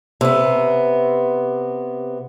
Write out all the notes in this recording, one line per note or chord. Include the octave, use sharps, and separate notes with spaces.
C3 B3